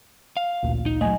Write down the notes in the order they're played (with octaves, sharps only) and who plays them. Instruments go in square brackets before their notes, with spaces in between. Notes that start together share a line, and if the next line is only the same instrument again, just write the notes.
[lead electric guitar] F5
[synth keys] A1 D2 A#2
[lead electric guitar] D#4
[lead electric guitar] F#3 A3 [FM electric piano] D#5 G#5